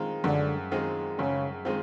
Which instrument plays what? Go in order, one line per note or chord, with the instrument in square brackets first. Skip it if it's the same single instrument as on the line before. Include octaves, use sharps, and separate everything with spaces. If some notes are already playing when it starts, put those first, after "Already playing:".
Already playing: [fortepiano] D#3 G#3 C4 F4
[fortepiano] F#2 [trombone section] D3
[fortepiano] D#3 G#3 C4 F4
[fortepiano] F#2 [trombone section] C#3
[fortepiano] D#3 G#3 C4 F4